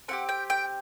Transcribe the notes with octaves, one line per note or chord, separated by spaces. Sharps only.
C4 E4 G4 F#5
G5
G5